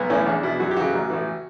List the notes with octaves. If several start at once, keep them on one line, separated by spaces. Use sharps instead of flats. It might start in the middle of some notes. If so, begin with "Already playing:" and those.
Already playing: B1 B3
A2 E3 C#4
E2 D4
B2 E4
F#2 F#4
G4
C#3 E3 F#4
A1
A2 E3